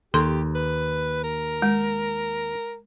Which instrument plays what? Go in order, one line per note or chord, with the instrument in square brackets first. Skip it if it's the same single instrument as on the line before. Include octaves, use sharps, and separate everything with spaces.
[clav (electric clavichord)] D#2 [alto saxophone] G4 [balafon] A4 C6
[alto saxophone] B4
A#4
[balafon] G#3